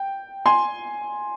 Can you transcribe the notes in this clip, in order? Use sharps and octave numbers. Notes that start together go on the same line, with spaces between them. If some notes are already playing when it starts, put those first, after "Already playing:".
Already playing: G5
G#5 C6